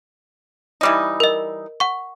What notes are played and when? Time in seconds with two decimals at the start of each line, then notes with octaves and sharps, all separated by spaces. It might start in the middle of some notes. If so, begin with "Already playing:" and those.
0.81 E3 G3 D#4
1.20 A#4 D#5
1.80 F#5 C#6